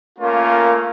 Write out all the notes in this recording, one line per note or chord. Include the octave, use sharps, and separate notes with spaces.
A3 A#3 C#4 F4 A#4 A#5